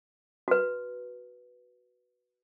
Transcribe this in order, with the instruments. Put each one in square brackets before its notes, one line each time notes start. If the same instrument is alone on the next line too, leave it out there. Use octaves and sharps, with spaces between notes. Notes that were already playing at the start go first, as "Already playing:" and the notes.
[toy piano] F#4 B4